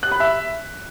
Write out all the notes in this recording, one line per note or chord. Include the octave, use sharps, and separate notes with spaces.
F#6
B5
E5